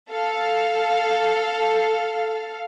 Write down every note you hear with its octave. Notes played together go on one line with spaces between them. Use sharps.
A4 F5